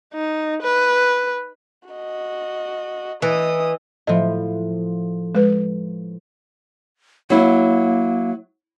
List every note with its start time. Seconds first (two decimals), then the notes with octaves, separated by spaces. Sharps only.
0.14 D#4
0.63 B4
1.89 F#4 D#5
3.22 E3 D#5 D#6
4.07 A2 F3 D#5
5.35 G#3 B4
7.30 F#3 A#3 E4